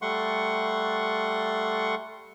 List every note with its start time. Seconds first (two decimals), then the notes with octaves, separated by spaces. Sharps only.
0.02 G3 A3 F#5 C6 C#6